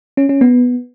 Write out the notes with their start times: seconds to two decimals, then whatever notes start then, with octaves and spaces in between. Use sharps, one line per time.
0.17 C#4
0.29 C#4
0.41 B3